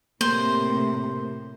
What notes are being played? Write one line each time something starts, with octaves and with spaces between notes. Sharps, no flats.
A2 C3 A#3 A#4 C5